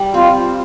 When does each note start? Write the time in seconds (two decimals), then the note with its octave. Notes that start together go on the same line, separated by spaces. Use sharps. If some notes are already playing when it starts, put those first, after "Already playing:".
Already playing: G3
0.14 C4 F4